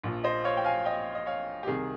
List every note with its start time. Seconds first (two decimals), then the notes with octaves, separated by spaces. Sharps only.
0.03 A#1 A#2 F3
0.24 C5 D#5
0.44 C#5 F5
0.57 G5
0.64 F5 G#5
0.85 D#5 G5
1.15 D#5
1.26 C#5 F5
1.63 G4
1.67 C2 C3 D#3 G#4